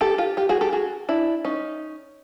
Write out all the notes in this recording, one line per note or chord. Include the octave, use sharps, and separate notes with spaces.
G4 A4
F4 G4
F4 G4
F#4 G#4
G4 A4
F#4 G#4
D4 E4
C#4 D#4